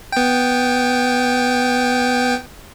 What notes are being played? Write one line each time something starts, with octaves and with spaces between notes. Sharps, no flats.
B3 G5